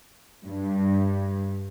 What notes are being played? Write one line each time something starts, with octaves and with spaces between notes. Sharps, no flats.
G2